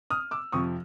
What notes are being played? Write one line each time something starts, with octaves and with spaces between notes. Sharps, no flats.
D#6 F6
D6 E6
F2 C3 F3 C#6 D#6